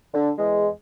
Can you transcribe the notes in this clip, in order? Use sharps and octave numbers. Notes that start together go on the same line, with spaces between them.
D3
E2 G#3